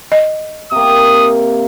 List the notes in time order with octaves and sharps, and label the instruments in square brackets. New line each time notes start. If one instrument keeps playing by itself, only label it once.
[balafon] D#5
[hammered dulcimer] C3 A#3 [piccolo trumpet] D#6